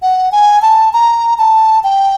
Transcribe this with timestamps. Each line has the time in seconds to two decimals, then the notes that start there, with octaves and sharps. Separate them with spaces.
0.02 F#5
0.32 G#5
0.62 A5
0.93 A#5
1.39 A5
1.84 G5